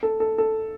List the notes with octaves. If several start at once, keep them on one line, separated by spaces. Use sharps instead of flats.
A4
A4
A4